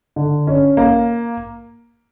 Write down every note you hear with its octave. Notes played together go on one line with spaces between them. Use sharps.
D3
C#4
A#3